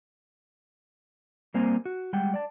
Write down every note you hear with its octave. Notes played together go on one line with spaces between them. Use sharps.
G3 A#3 C4 C5 G#5 A#5
F#4
G3 G#3 F#5 G5
D5 A5